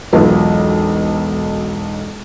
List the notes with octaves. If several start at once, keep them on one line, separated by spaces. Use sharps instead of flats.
E1 B1 F#3 F4 B4